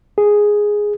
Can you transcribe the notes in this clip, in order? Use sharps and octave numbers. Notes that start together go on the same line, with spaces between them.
G#4